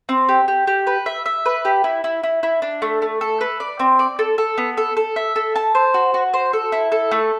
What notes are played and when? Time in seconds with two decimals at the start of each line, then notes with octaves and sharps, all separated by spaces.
0.09 C4
0.29 G4
0.48 G4
0.67 G4
0.87 B4
1.06 E5
1.26 E5
1.46 B4
1.65 G4
1.84 E4
2.04 E4
2.23 E4
2.43 E4
2.62 D4
2.82 A3
3.02 A3
3.21 A4
3.41 B4
3.60 D5
3.79 C4
3.99 D5
4.19 A4
4.38 A4
4.58 B3
4.77 A4
4.97 A4
5.16 E5
5.36 A4
5.56 A5
5.75 C5
5.94 F#4
6.14 F#4
6.33 C5
6.53 A4
6.72 E4
6.92 A4
7.11 A3